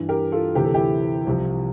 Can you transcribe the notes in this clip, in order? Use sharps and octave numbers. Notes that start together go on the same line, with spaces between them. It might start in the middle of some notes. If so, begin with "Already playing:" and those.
Already playing: G2 E3
G4 A#4
F4 A4
D2 C3 E3 G4
A4
E4 G4
C2 C3 F3